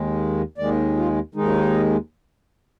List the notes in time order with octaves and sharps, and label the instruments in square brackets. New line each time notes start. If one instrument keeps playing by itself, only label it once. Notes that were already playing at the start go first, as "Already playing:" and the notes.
Already playing: [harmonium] D#2 D#3 G#3
D#2 D#3 G#3 D5
F4
D#2 D#3 G#3 D#4